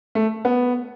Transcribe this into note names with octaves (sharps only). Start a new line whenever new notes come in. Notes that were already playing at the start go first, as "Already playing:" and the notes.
A3
B3